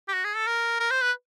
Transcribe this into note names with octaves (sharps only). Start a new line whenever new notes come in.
G4
F#4
G#4
A4
A#4
A#4
C5
B4